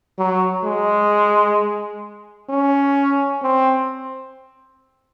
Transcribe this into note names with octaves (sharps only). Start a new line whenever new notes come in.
F#3
G#3
C#4
C4